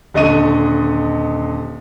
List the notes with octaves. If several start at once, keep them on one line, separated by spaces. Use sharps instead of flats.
D#1 D3 D#5 C#6 D#7